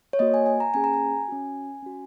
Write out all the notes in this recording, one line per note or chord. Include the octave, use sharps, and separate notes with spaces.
C#5
A#3 F#4 D#5
G#5
G#5
A#5
A#3 C#4 G#4 G#5
A#5
G#5
C#4 F#4
C#4 F#4